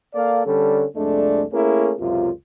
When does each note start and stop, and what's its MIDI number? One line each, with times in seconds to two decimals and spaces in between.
0.14 0.41 58
0.14 0.41 69
0.14 0.41 74
0.14 0.41 77
0.46 0.85 50
0.46 0.85 55
0.46 0.85 61
0.46 0.85 69
0.96 1.44 36
0.96 1.44 41
0.96 1.44 56
0.96 1.44 57
0.96 1.44 62
0.96 1.44 74
1.53 1.94 57
1.53 1.94 58
1.53 1.94 61
1.53 1.94 64
1.53 1.94 68
1.53 1.94 70
2.00 2.31 37
2.00 2.31 42
2.00 2.31 48
2.00 2.31 65